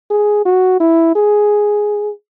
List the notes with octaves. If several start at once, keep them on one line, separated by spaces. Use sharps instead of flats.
G#4
F#4
E4
G#4